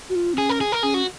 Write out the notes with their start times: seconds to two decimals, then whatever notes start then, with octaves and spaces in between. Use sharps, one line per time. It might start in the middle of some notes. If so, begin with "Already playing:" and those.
0.09 F#4
0.15 F4
0.34 C4
0.38 C#4 G#4
0.49 A#4
0.61 G#4
0.72 A#4
0.83 C#4 G#4
0.94 F#4